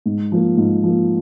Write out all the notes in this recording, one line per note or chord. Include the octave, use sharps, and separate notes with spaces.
G#2
F3 A#3
G#2
F3 A#3